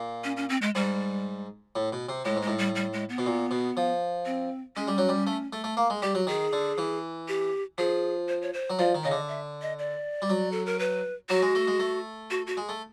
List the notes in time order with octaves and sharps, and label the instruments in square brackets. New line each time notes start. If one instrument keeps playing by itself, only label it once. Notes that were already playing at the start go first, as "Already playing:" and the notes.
Already playing: [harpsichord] A#2
[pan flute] C#4
C#4
C4
G#3
[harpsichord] G#2 [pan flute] G3
[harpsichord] A2
B2
C3
[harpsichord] A2 [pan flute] G#3
[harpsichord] G#2
[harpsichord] A2 [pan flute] G#3
[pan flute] G3
G3
G#3
B3
[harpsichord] B2
A#2
B2
F3
[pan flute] C4
[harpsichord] G#3 [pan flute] C#4
[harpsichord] G3
F#3
G3
A3
A3
A3
A#3
G#3
[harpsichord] G3 [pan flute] G4
[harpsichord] F#3
[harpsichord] D#3 [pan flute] G#4
[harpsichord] D3
E3
[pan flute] G4
[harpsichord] F3 [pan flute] G#4
[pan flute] C5
C#5
C5
[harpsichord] F#3
[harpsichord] F3 [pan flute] D5
[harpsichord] D#3
[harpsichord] C#3 [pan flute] D#5
[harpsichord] D3
[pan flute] E5
D#5
D5
[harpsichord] G3
F#3
[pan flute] A4
A#4
B4
[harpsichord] F#3 [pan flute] F#4
[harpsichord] G#3
A3
G#3
A3
[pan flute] F#4
F#4
[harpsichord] G#3
A3